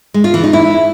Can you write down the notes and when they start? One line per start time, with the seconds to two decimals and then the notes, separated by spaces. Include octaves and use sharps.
0.14 G#3
0.24 F4
0.34 E3
0.44 D#4
0.53 E4